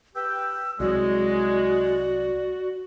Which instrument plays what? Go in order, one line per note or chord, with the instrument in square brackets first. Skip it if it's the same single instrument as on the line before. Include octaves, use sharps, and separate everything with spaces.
[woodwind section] G4 B4 G5 [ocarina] E6
[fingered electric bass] C2 F#3 [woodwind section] G#3 [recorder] F#4 [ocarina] D5